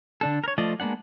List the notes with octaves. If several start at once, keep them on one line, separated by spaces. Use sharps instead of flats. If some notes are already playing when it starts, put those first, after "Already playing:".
D3 D4 A4
A#4 C#5
F3 A3 F4 D5 D#5
G#3 A#3 B3 D4 F#5